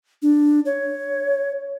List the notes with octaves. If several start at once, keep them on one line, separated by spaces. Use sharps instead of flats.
D4
C#5